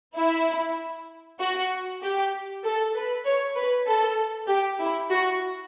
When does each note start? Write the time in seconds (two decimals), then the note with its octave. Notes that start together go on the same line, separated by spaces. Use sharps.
0.18 E4
1.41 F#4
2.03 G4
2.65 A4
2.95 B4
3.26 C#5
3.56 B4
3.87 A4
4.48 G4
4.80 E4
5.10 F#4